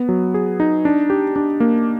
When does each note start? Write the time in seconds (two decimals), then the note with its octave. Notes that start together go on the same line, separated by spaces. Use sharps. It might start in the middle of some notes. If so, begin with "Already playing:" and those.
Already playing: B3
0.09 F#3
0.34 G#4
0.60 D#4
0.85 D4
1.10 G4
1.36 D4
1.60 A#3